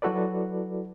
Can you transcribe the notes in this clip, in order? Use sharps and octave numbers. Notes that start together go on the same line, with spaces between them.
F#3 E4 F#4 A4 B4 D5